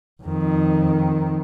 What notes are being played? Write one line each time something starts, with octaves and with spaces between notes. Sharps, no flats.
F2 D#3